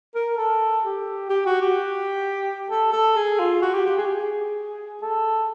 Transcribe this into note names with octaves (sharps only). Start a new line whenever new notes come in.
A#4
A4
G4
G4
F#4
G4
A4
A4
G#4
F4
F#4
G4
G4
G#4
G4
G#4
A4